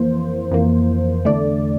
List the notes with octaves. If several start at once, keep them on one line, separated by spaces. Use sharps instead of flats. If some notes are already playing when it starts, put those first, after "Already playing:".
Already playing: F2 E3 A#3 C5
F2 E3 A#3
E2 D3 A3 D5